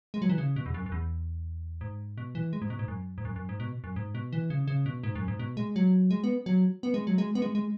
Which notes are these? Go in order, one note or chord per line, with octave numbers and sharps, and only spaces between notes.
G#3
F#3
E3
C#3
B2
E2
F#2
F#2
E2
G#2
B2
E3
G#3
G#2
B2
G#2
F#2
G#2
F#2
F#2
G#2
B2
F#2
G#2
B2
E3
C#3
C#3
B2
G#2
F#2
G#2
B2
G#3
F#3
G#3
B3
F#3
B3
G#3
F#3
G#3
B3
G#3
G#3